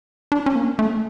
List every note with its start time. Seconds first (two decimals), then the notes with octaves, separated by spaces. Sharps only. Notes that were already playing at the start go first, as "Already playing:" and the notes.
0.32 D4
0.46 C#4
0.55 A#3
0.79 A3